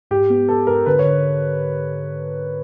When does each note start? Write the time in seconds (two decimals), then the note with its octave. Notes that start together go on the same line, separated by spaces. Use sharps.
0.11 G#2 G4
0.30 B3
0.48 B3 A4
0.67 G#2 A#4
0.86 D3 B4
0.99 C#5
1.05 D3